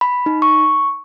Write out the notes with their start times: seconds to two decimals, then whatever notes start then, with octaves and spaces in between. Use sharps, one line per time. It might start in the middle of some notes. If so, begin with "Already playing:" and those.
0.01 B5
0.26 D#4
0.42 C#6